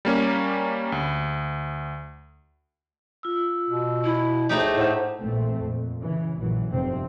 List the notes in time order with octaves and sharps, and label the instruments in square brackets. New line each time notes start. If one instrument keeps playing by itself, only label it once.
[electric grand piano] G3 A#3 C#4
D2
[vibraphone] F4 E6
[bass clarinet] B2
[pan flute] E4
[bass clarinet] D2 [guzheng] A3 D#4 G4 [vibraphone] G#4 C5 C#5
[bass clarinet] A2 [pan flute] C5 [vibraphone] F#5
[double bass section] A#1 E3 A3 C4
F2 A#2
C#3 E3
A#1 F#2 A#2 E3 F#3
F1 G2 C3 F3 C4